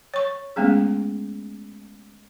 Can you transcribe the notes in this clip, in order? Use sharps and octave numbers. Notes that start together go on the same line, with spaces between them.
C#5 C#6
G#3 A3 B3 C#4 G#4